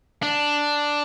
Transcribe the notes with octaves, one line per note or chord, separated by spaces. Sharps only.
D4